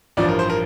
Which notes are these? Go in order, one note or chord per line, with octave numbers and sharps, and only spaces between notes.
A1 G2 F3 D5
A#4
C5
A#4